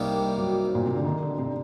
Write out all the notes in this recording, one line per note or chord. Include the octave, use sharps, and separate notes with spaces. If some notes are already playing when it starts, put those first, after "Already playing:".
Already playing: C2 C3 G3 A#3 D#4
F#3
A#2
C3
D3
D#3
D3
C3